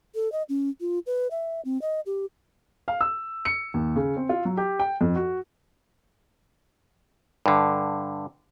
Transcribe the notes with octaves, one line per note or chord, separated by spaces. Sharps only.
A4
D#5
C#4
F4
B4
E5
C4
D#5
G4
F5
E6
C#7
D#2
C#3
C4
F4
F#3
G4
G5
F2
F#4
G2 D3